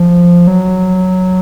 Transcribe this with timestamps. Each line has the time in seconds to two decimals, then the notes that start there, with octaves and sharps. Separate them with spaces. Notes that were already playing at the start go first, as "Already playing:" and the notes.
Already playing: F3
0.48 F#3